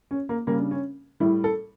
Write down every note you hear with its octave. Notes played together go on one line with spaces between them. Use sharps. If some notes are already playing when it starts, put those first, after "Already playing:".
C#4
A#3
C#3 G3 A#3
D4
C#4
A2 G3 E4
A4